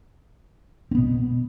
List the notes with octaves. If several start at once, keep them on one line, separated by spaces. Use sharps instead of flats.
B2 B3 C4